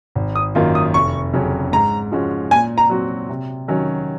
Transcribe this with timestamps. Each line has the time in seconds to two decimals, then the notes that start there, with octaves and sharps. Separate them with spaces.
0.15 G#1
0.36 D#6
0.55 F#2 D#3 A#3 F4
0.75 D#6
0.94 F1 C#6
1.33 F2 C#3 F#3 C#4
1.73 G#2 A#5
2.12 F3 G#3 C#4 F#4
2.51 A#2 G#5
2.78 A#5
2.90 F#3 C4 F#4
3.29 C3
3.68 D#3 F#3 C#4